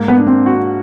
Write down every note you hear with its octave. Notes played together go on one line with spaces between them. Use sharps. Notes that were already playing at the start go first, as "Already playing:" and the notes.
Already playing: G#2 A#3
B3
D4
C4
F#4